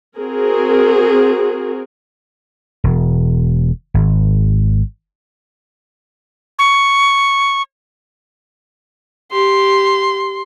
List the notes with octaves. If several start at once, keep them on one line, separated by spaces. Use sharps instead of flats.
C4 F#4 G#4 A#4
E1
G#1
C#6
G4 C6